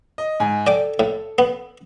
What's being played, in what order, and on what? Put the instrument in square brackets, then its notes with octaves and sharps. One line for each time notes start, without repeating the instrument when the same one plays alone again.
[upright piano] D#5
G#2 G#5
[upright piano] A4 [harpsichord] D5 G5 D6
[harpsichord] A2
B3